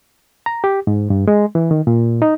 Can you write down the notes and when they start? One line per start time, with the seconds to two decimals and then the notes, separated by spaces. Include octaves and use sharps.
0.46 A#5
0.64 G4
0.87 G#2
1.10 G2
1.28 G#3
1.55 E3
1.71 D#3
1.87 A#2
2.22 D#4